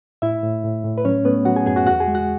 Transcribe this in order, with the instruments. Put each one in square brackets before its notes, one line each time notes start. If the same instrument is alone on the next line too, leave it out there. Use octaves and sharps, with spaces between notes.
[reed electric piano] A2 E4 E5
A2
A2
A2
B4
F#3 C#4 C#5
A3 B3 B4
F#3 F#4 F#5
G#4 G#5
F#2 G#4 G#5
F#4 F#5
E2 F#4 F#5
G#4 G#5
G#3
F#4 F#5